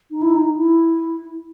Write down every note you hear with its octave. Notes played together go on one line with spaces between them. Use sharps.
D#4
E4
D#4
E4